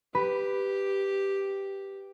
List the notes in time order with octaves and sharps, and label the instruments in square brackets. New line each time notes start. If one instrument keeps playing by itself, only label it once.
[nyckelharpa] G4 [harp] B4